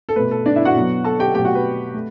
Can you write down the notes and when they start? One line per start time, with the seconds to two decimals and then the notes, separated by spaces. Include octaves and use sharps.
0.09 A4
0.16 B2 A3 B4
0.31 A4
0.46 D4 D5
0.56 E4 E5
0.65 F#4 F#5
0.75 B2 F#3 B3
1.04 A4 A5
1.19 G4 G5
1.34 B2 F#3 A3 G4 G5
1.44 F#4 F#5
1.55 B4
1.94 A3